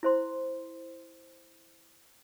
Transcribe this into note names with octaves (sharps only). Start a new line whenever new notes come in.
E4 C5 C6